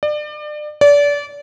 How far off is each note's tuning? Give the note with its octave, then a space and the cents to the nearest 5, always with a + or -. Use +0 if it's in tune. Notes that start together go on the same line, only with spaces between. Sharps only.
D5 +30
D5 -30